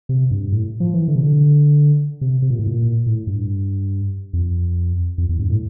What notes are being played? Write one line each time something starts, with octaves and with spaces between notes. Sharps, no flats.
C3
G2
A2
F3
E3
D3
C3
D3
C3
C3
A#2
A2
A#2
A2
G2
F2
F2
E2
G2
A2